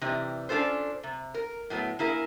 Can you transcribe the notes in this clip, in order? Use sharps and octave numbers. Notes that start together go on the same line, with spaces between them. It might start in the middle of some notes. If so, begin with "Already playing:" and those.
C3 E3 G3 D#4
C#4 D4 F4 A4 C5
C3
A#4
A2 F#3 B3
A#3 E4 G#4 A#4